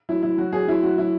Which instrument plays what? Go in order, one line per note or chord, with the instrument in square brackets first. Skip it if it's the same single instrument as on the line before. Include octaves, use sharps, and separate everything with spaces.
[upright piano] F#3 E4
F#3 E4
F#3 F#4
F#3 G#4
F#3 E4
F#3 F#4
F#3 E4